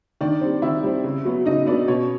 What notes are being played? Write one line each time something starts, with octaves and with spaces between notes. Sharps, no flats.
D#3 D4 D5
G3 C4
D#3 E4 E5
G3 C4
C#3
F#3 B3
C#3 D#4 D#5
F#3 B3 D4 D5
B2 C#4 C#5